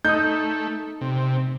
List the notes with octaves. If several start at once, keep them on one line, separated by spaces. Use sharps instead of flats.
A3 D#4 D#6 G6
C3